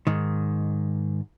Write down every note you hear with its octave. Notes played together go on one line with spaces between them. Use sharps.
G#2 D#3